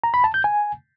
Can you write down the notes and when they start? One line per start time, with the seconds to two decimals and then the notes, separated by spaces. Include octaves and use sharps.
0.04 A#5
0.14 B5
0.24 A5
0.34 G6
0.44 G#5